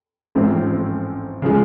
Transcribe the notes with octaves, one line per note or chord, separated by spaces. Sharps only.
A1 G#2 F3 A3 C4
C#3 F3 G#3